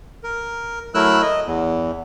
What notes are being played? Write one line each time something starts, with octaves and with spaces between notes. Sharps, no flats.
A#4
F#3 A3 E4 A#4 E6 F#6
D#5
E2